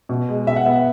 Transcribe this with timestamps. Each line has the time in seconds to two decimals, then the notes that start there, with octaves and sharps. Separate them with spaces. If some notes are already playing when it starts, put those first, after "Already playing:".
0.09 B2
0.29 G#3
0.47 B2 E5
0.56 F#5
0.66 B3 E5
0.76 E5